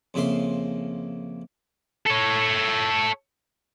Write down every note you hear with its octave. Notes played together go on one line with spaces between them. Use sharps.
F2 C#3 A#3 E5 C6
A4 C#5